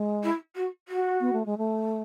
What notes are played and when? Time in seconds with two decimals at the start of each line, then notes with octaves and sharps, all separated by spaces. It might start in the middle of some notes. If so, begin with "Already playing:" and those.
Already playing: G#3
0.23 E4
0.55 F#4
0.88 F#4
1.21 B3
1.33 A3
1.46 G#3
1.58 A3